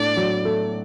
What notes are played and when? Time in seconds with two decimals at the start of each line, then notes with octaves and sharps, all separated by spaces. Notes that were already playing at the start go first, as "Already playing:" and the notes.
Already playing: A2 D4 D5
0.16 F#3
0.45 A3